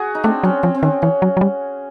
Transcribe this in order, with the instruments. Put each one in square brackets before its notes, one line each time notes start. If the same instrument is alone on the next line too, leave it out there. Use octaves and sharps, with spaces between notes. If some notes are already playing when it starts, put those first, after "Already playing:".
Already playing: [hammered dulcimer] F#4 G#4
D#4
[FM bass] A3 [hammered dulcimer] C4 D4
[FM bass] F#3 [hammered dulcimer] C#4
[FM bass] F3 [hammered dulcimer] C4
[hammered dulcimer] C4
[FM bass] D#3 [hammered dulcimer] C#4
[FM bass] E3 [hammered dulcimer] C#4
[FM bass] F#3
F#3
G3